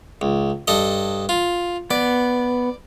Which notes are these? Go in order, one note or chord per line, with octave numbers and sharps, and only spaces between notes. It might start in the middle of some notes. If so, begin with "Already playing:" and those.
C#2
G2 A4 D#5
F4
B3 D5